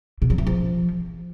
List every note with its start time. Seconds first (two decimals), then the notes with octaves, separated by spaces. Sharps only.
0.22 B2
0.30 F#3
0.38 E3
0.47 F3